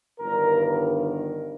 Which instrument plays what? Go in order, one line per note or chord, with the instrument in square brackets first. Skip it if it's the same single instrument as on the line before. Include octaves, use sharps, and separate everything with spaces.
[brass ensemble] G1 G2 D#3 A#4